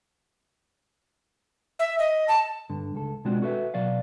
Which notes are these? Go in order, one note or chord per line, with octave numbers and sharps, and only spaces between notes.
E5
D#5
A5
G2 D3
C#2 A4
B2 G#3 C4 D4 F4 F#4
F#4 A4 B4 E5
B2 F#3 D5 F5